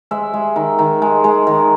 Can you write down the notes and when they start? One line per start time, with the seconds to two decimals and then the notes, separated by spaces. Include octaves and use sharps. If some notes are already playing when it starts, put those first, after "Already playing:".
0.11 G#3 E5
0.34 G#3
0.56 D#3
0.79 D#3
1.02 G#3
1.24 G#3
1.47 D#3